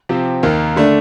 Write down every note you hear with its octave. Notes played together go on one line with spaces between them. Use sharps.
C3 F3 C4 G4
D#2 D#3 A#3
D3 A3 D4